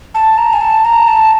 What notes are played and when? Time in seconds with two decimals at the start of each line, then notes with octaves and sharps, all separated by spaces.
0.15 A5
0.38 A#5
0.53 G#5
0.61 A5
0.85 A#5
1.08 A5